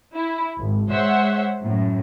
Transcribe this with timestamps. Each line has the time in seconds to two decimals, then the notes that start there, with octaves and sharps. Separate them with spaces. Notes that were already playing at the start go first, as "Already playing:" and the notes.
0.15 E4
0.57 G#1
0.91 G#3 C5 C#5 E5 F#5
1.62 F#2 A2